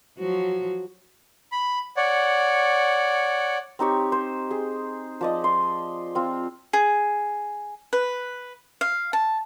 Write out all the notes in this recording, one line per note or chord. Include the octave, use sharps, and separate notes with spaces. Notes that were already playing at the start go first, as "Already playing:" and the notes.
F3 F#3 F#4
B5
C#5 D5 F#5
C4 D#4 G4 C#5
C5
G#4
F3 D5 D#5
C6
C4 F4
G#4
B4
F5
A5